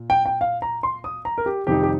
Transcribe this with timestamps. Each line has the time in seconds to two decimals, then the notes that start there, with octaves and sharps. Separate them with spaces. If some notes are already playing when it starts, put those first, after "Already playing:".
Already playing: A#2
0.10 G5
0.26 G5
0.41 F5
0.62 A#5
0.83 C6
1.04 D#6
1.25 A#5
1.38 A#4
1.46 G4
1.67 F2 C3 D#3 G3 D#4 G4
1.83 G4